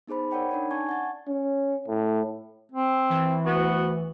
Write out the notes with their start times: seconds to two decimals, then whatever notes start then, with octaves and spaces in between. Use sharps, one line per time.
0.07 B3 D#4 G#4 C5 B5
0.31 A#4 C#5 D5 F#5 G5 B5
0.51 D4 D#4 D5
0.71 C#4 D5 G#5 A5 C#6 G#6
0.89 F#5 A6
1.28 C#4
1.88 A2
2.72 C4
3.10 E3
3.45 D2 B3 F#4